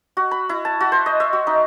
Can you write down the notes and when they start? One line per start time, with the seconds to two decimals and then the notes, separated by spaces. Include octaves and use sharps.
0.17 F#4
0.31 B5
0.49 E4
0.65 A5
0.80 F#4
0.92 C5
1.06 D#5
1.20 E5
1.33 F#4
1.47 D#4